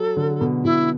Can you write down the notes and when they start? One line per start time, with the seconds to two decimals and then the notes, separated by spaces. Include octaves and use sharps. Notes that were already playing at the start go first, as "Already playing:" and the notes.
Already playing: F#3 A4
0.17 D3
0.41 B2
0.64 B2 E4